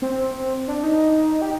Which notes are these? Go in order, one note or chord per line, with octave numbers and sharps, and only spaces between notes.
C4
D4
D#4
G4